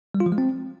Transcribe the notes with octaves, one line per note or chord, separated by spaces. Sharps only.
G3
F4
F3
G#3
C4